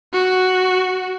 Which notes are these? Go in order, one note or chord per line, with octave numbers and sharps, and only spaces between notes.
F#4